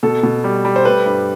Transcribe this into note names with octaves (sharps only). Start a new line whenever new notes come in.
B2 A4
B2
G3
G3
C5
A3 B4
G2